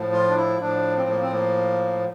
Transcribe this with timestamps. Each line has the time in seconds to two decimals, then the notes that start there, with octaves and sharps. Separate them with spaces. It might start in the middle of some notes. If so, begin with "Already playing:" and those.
Already playing: A2 F3
0.13 F4
0.29 D4
0.37 E4
0.60 A2 F3 D4
0.96 C4
1.09 A#3
1.21 C4
1.32 A#3